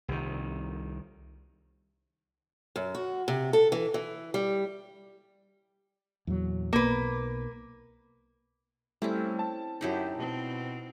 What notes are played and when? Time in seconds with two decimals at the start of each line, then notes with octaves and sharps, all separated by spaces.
0.08 C2 D#3
2.76 F#2
2.95 F#4
3.28 C3
3.53 A4
3.72 E3
3.94 E3
4.34 G3
6.27 E2 A#2 F#3
6.73 B1 A#3 B4
9.02 G3 A3 C4 C#4 E4
9.39 A5
9.81 F#2 D#4 E4 G4
10.15 B2 C4